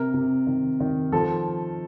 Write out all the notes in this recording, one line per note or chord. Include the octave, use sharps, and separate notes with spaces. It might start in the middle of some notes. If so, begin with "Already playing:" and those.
Already playing: C3 A#4
C3
D#3
D#3
F3 A4